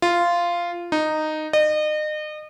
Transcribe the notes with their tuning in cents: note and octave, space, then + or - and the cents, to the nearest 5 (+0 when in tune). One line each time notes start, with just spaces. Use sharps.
F4 -10
D#4 -10
D#5 -35